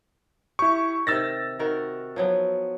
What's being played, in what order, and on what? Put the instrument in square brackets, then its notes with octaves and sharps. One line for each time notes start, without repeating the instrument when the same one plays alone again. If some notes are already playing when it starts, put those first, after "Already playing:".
[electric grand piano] E4 C#6 [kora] G4
[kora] C3 D#3 [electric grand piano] E6 A6 A#6
[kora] D#3 F#4 A#4
F3 F#3 B3